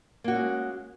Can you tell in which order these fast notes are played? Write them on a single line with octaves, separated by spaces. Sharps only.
A#3 F#4 C#4 G#3